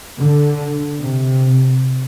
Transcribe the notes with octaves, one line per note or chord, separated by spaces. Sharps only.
D3
C3